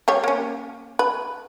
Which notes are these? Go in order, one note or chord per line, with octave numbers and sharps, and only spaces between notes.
G3 G4 C#5
A#3 C#4
B4